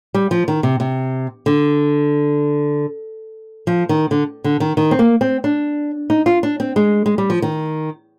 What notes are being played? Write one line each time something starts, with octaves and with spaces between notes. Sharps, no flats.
G3
F3
D#3
C3
C3
D3
F3
D#3
D3
D3
D#3
D#3
C4
A#3
C4
D4
D#4
F4
D4
C4
G#3
G#3
G3
F3
D#3